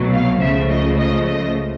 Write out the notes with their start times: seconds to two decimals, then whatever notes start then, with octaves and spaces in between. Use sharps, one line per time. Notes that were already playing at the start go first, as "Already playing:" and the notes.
Already playing: C2 B2 F#3 A3
0.13 F5
0.41 C#2 C#3 F3 A3 E5
0.69 D#5
0.97 D#5
1.26 D#5